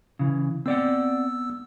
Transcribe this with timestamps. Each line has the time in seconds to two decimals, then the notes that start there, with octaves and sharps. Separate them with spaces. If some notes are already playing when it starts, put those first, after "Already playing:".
0.19 C#3 E3
0.66 B3 C4 D5 F#5 E6